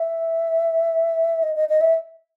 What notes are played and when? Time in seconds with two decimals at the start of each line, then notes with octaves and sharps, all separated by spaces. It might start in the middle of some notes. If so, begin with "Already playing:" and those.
Already playing: E5
1.43 D#5
1.56 D#5
1.69 D#5
1.81 E5